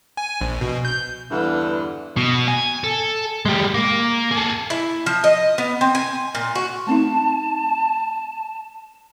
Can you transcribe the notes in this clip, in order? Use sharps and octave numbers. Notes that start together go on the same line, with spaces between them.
G#5
A#1
B2
G6
E2 G2 D3 E3
B2
G#5
A4
G#3 G4
A#3
G#4 A4
E4
F3
D#5
B3
C4
G#5
A#2
F#4
A3 C4 D#4 A5